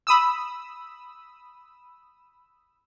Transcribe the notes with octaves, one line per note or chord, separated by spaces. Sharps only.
B5 D#6 E6